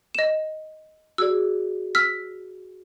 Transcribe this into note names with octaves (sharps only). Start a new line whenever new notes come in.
D#5 E7
F#4 G#4 D5 E6
E6 F6 B6